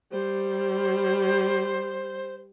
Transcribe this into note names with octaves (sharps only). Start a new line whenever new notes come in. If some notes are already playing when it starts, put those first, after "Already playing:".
G3 C5